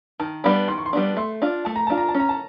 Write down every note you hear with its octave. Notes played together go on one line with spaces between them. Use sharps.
D#3 A5
G3 B3 D4 B5
D#3 C6
C#6
C6
G3 B3 D4
A3 C6
D4 F4
A3 A5
A#5
D4 F4 A5
A#5
A5
C#4 A#5
A5